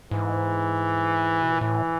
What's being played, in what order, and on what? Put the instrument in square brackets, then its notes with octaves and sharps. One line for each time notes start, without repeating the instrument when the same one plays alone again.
[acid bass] G#2 [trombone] E3
[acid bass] B2
A#2
[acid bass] A2 [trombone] E3